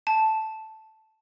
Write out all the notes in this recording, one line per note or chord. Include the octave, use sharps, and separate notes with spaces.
A5